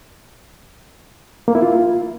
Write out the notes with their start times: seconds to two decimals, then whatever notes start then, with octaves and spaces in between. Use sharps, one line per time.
1.48 A#3
1.55 E4
1.62 F4